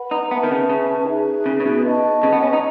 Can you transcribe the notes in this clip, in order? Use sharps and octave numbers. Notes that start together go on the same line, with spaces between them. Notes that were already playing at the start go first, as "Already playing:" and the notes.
Already playing: B4 F#5 B5
D#4
B3 B4 E5 A5 C#6
D#3
C#3
C#3
D#4 G#4 B4 E5
C#3
C#3
B2
B4 D#5 A5 C#6
C#3
B3
C#4
D#4